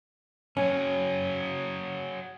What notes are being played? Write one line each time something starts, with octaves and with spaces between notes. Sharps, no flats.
F#3 C#4 G#4